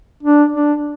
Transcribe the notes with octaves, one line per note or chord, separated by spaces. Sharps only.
D4
D4